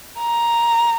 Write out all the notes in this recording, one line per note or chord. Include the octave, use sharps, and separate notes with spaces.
A#5